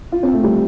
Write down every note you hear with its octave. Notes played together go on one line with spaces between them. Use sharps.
F4
C4
A3
G3